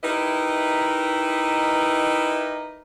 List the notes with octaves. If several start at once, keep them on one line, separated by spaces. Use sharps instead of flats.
D#4 E4 G4 A#4 B4 D#5